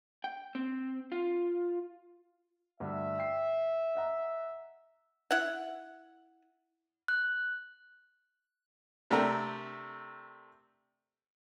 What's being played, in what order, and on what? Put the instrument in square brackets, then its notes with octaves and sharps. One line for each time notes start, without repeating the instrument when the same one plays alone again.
[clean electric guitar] G5
C4
F4
[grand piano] D2 G2 [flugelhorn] E5
[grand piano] G5 C7
D#5 F#5 A#5
[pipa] E4 F#5
[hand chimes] F#6
[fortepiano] C3 A3 D4 G4 A#4